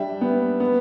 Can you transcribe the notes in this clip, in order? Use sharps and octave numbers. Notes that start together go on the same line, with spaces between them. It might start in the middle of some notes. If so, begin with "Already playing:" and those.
Already playing: G3 D4 E5 G5
B3
B3